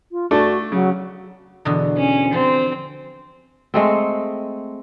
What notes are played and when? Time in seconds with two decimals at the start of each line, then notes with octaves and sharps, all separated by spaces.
0.12 F4
0.31 A3 D4 F#4 A4
0.72 C#3 F#3
1.65 E2 B2 D3
1.97 C#4
2.33 F3 C4
3.74 G#3 A3 C4